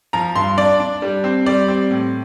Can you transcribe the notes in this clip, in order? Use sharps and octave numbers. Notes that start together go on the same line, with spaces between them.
F3 A#5
G2 C6
D4 D5
D4
G3
C4
G3 D5
C4
A2